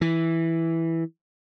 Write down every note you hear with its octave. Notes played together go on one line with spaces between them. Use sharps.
E3